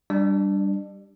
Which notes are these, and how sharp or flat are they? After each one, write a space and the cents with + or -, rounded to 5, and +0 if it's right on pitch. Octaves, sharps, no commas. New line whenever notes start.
G3 +0 D4 +0 D5 +40